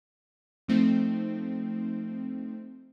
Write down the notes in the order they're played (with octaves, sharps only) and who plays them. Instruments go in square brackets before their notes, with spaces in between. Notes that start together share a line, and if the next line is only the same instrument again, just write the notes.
[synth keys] F3 A3 C4 D#4